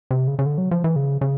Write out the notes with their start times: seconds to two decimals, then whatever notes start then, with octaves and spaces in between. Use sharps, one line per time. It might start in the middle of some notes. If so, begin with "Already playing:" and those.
0.11 C3
0.28 C#3
0.39 C#3
0.46 D3
0.58 F#3
0.71 F3
0.84 E3
0.96 C#3
1.21 C#3